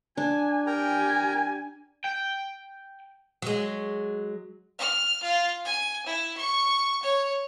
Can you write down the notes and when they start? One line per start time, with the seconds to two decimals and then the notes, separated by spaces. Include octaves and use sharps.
0.17 D4 G#5
0.67 G4 A#4 G5 G#5 A#5
2.04 G5
3.42 F#3 G#3
4.78 F6
5.22 F4
5.65 G#5
6.05 E4
6.37 C#6
7.02 C#5